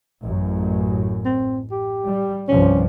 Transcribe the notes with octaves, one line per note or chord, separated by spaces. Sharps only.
A1 F#2
C4
G4
G3
C2 G2 F3 C#4